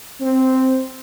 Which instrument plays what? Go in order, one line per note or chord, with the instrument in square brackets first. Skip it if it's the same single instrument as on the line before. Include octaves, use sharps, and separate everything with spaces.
[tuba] C4